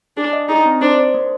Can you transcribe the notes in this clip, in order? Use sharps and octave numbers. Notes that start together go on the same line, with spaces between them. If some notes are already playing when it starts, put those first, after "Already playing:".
D4 G#4
D#5
D#4 G#4
C4
D4 C5
C5
A#3